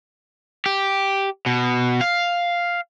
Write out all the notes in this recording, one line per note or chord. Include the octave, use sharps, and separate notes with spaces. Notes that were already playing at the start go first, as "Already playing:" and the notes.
G4
B2
F5